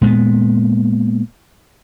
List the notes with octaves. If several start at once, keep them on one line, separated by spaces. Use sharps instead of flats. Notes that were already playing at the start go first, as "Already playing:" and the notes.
A#2 G#3 A3 B3